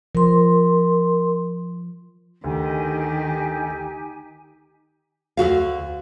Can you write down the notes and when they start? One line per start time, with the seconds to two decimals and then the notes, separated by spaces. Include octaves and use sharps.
0.15 F3 A#4 C6
2.44 D2 D#3 D#4 G4 G#5
5.37 D2 D#3 F#4 F5